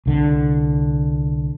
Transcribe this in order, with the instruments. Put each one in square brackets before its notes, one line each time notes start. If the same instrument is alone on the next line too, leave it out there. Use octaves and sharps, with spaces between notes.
[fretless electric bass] C2 D3